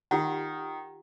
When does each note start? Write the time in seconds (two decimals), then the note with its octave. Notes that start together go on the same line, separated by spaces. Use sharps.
0.11 D#3 F4 G4 F#5